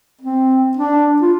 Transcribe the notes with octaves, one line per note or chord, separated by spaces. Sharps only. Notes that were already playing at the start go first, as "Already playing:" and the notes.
C4
D4
F4